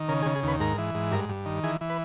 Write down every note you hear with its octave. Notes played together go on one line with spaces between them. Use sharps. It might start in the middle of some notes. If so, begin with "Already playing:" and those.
Already playing: D#3
C#3 A#4
G#4
C#3
G#4
D#2 B4
G#2 A#4
E3
G#2
G2 A#4
G2
D#3
E3 G#4
E3
B4